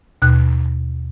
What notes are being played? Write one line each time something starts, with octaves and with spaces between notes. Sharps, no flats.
D#2 B2 F#6